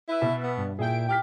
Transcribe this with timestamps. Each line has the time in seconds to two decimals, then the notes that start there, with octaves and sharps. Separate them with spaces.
0.08 E4 B4 E5
0.22 B2
0.43 B3
0.57 G2
0.79 A#2 E4 G#4 G5 D7
1.09 G4 G5 F6 B6